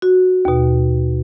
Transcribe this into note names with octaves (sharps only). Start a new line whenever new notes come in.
F#4
D#2 B2